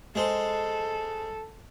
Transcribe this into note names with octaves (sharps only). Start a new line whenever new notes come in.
G#3 A4 C5